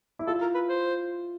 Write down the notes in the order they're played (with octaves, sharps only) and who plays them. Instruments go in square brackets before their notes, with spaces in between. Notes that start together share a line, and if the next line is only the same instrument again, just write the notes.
[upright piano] E4
[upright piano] F4 [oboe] A4
[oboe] A#4
B4
C5